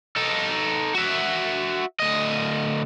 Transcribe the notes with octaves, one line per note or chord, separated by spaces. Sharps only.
D#4 A4
F#4 E5
D2 D#5